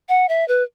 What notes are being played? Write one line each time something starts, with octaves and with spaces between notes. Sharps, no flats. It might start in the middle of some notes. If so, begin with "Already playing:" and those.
F#5
E5
B4